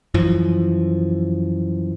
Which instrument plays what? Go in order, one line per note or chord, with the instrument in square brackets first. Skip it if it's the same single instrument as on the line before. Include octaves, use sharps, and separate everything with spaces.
[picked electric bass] F#2 E3 F3